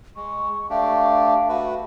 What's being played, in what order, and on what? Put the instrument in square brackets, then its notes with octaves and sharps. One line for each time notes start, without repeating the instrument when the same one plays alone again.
[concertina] G#3 [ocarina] C#6
[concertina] A3 D4 G4 [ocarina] F5
[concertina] A3 F#4 B4